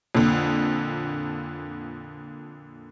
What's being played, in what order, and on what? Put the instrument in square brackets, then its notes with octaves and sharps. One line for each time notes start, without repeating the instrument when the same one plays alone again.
[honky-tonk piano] F2 A#2 D3